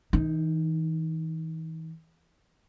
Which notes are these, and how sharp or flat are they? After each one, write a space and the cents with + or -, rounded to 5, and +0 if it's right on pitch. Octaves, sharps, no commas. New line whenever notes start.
E3 -40 D#4 +0